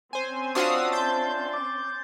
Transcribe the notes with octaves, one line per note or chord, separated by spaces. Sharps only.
C4 C#4 C5 G#5 C6
D4 F4 F#4 C5 E5 F5 C#6 D#6
G6 A6
D6